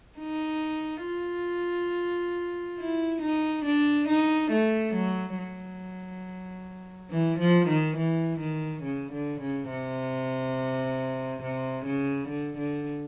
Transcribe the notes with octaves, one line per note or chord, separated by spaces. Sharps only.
D#4
F4
E4
D#4
D4
D#4
A3
F#3
F#3
E3
F3
D#3
E3
D#3
C#3
D3
C#3
C3
C3
C#3
D3
D3